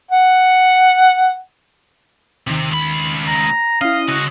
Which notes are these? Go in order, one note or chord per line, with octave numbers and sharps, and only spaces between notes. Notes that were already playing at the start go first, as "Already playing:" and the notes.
F#5
D#2 C3 D#3
C#2 B5
A#5
C#4 E4 D#5 F5
C#3 F#4 D#5